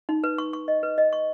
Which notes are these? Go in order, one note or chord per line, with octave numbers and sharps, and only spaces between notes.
D#4
B4
C#6
C#6
D#5
B4
D#5
C#6